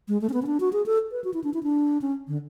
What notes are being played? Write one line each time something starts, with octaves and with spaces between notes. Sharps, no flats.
G#3
A3
C#4
B3
C#4
D4
F#4
G#4
A4
B4
F#4
E4
D4
E4
D4
C#4
D3